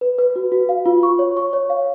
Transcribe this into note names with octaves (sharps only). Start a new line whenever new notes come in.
B4
B4
F#4
F#4
F5
F4
C#6
C#5
C#6
C#5
F5